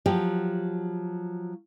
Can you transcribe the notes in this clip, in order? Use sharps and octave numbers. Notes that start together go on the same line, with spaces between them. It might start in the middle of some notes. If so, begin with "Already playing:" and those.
F3 F#3 G4